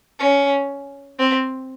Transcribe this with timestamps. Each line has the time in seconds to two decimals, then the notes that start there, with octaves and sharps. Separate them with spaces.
0.19 C#4
1.19 C4